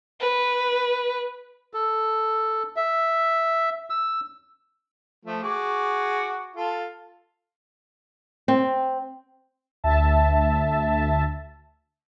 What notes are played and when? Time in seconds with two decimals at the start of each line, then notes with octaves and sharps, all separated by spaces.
0.20 B4
1.74 A4
2.76 E5
3.90 E6
5.25 F3 A3 F4
5.43 F#4 G#4 D6
6.56 F4 A4
8.48 C4
9.84 D2 E5 A5